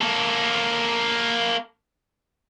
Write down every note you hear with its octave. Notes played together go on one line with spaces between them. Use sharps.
A#3 A4